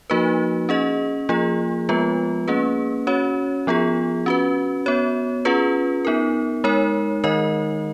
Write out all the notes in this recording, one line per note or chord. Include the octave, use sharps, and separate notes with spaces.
F3 A#3 D#4 F#4 B4
C#4 G#4 D#5
F3 A#3 F4 G#4
F3 G#3 B3 F4 B4
A#3 C#4 G#4 B4
C#4 F#4 C#5
F3 B3 F4 G#4
C#4 F#4 B4
B3 F#4 C#5
C#4 F4 G#4 B4
B3 D#4 A#4
G#3 D#4 A#4 C#5
D#3 G#3 D#4 A#4 D#5